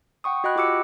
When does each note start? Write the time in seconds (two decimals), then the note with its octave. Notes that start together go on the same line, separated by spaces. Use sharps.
0.24 F#5 G5 C#6 D#6
0.44 F#4 D#5 F#5 G5 B5 F#6
0.56 F4 G4 D6 E6 C#7